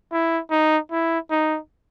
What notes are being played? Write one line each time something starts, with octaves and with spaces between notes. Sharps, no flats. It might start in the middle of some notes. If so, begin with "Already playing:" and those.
E4
D#4
E4
D#4